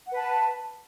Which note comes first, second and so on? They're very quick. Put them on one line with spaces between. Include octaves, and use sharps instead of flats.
F#5 B4 A5